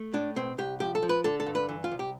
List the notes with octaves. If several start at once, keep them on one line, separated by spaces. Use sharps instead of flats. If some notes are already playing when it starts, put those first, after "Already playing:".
Already playing: A3
A2 D4
B2 C4
C2 G4
F3 G4
A4
F3
B4
D3 A4
A4
G2
B4
E3
F4
C2
G4